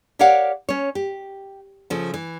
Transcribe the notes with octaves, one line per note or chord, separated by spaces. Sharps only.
G4 A#4 C#5 D5 F5 F#5
C#4 C#5
G4
C#3 F3 A3
E3